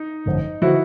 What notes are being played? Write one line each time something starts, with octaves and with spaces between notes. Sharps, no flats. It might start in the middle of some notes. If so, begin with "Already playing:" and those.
Already playing: D#4
G#1 F#2 D3 F3
D3 F3 E4 F#4